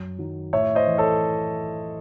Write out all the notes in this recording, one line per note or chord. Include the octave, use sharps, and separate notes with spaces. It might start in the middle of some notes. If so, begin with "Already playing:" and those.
Already playing: F#2
D#3 F#3
A2 C#5 E5
C5 D#5
E3
A4 C#5